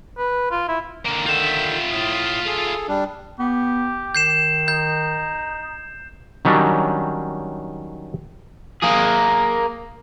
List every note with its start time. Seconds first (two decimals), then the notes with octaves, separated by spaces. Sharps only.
0.18 B4
0.51 F4
0.68 E4
1.05 D3 A#3
1.26 D3 D#3 F4 E5 G6
1.91 A2 D#6
2.46 G#4 A4
2.88 G3 D4
3.39 B3 G4
4.15 D#3 G6 C7 E7
4.68 D#4 G6
6.45 D#3 F#3 G3 C#4 D4
8.82 A#3 G#4